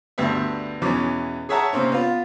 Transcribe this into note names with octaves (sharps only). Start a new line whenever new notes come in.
D2 G2 B3 E5
E2 B2 E3 C#4 D6
G#4 C#5 E5 F#5 A5 A#5
C3 A#3 C4 C#4
B3 F4